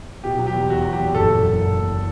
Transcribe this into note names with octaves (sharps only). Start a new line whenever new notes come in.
B2 G4
F#3
G4
E2
E2 F#4
F#3
G4
E2
F#1 A4
F#1
F#2
F#1
F#1